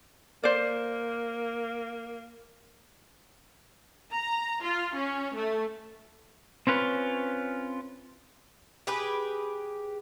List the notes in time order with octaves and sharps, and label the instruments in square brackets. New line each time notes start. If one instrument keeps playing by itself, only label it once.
[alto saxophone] A#3 [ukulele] C5 D5
[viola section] A#5
F4
C#4
A3
[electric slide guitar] C4 C#4 F4 B4 C#5
[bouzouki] G4 G#4 B4